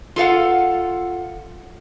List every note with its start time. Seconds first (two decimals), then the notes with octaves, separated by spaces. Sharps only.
0.16 F4 A4 F5 F#5